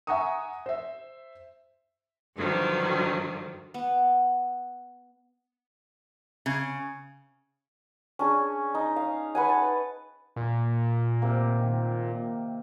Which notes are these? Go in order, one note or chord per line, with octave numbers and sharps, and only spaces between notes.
E5 F#5 G#5 A#5 C#6 D#6
C5 E5
G2 D3 D#3 F3 F#3
B3
C#3
C#4 D4 G#4
D#4
F5
B4 F#5 G#5
A5
A#2
C3 A#3
D#3